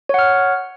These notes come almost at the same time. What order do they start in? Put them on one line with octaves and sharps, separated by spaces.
C#5 F#5 F6